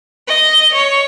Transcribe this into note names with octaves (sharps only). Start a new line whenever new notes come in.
D#5
C#5